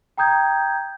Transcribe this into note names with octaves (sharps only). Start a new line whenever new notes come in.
G5 A#5 D#6 G6 G#6